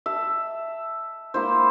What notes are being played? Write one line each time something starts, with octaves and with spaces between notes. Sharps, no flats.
E5 A5
A#3 E4 C5